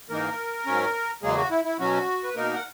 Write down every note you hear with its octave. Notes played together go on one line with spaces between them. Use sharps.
G#2 E3 A#3 D#4 A#4
G#2 F#3 C#4
E2 C#3 F#3 G#3 A#3 G#4
F#4
E4
E4
B2 F#3 C#4 F#4
B4
B2 A#3 D#4 A#4
F#5